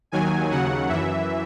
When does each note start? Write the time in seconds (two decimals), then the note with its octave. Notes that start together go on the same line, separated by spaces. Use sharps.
0.12 D#2 D#3 F#3 G#5
0.50 D#2 C#3 F#3 F#5
0.89 F#2 E3 E5